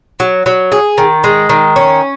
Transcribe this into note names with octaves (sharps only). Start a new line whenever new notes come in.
F#3
F#3
G#4
D#3
G#3
D#3
C#4